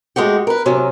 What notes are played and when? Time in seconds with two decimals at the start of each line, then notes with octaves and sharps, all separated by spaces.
0.16 G#3 A3 F#4 G4
0.47 A#4 B4
0.66 C3 F#3 C#4